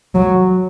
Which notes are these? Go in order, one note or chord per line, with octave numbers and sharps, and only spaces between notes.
F#3